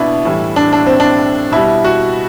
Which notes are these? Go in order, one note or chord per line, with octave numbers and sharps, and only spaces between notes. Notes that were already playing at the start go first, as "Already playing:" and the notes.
Already playing: B2 B3 D4 E4
A2 E3 G3
D4
D4
C4
D4
B2 G3 E4
F#4